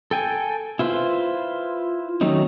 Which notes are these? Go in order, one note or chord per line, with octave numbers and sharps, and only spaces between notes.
A4 G5 G#5
E4 F4 B4 C5
D#3 F#3 A3 C#4 D#4